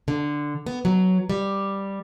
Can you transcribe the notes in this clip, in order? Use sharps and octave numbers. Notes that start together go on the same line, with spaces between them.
D3
B3
F#3
G3